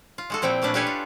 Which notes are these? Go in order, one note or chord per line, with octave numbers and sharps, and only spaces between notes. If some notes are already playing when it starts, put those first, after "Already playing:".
F4
G#3 F#4 A4
A#2 F3 C4 E4 G5
A#2 A3 C#4 D4 B4
D4 G4 A4 B4 C#5 G#5
F4